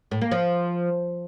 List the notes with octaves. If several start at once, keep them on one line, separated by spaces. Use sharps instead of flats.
A2
A#3
F3